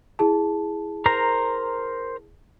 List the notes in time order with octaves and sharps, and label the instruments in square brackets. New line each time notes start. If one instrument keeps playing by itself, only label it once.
[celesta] E4 G#4 A5
[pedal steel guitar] A#4 C5 A#5